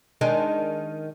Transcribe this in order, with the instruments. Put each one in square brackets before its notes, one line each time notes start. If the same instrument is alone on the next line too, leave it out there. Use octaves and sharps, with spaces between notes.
[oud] D#3 G#3 D4